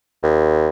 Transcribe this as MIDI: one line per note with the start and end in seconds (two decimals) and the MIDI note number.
0.23 0.69 39